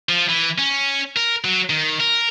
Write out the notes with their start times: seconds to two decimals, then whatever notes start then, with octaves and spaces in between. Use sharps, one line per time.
0.09 F3
0.29 E3
0.58 C#4
1.16 A#4
1.45 F#3
1.70 D#3
2.00 A#4